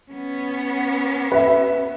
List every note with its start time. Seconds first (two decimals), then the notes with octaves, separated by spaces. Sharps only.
0.12 B3 C#4
1.32 B4 E5